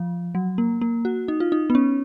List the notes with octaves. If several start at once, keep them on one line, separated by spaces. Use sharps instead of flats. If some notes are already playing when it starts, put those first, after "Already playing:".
Already playing: F3
F#3
A#3
A#3
F#4
D#4
F4
D#4
B3
C#4